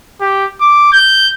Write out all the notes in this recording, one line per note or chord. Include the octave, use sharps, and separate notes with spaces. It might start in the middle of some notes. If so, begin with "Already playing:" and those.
G4
D6
G6